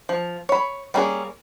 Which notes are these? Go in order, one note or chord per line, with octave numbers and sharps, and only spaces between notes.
F3
C#5 B5
G3 A#3 C#4 E4 G#4